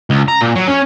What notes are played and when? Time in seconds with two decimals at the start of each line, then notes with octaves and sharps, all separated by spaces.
0.10 C#2
0.28 A#5
0.41 A#2
0.55 F#3
0.67 C#4